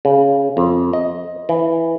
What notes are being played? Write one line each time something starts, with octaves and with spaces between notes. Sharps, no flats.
C#3
F2
D#5
E3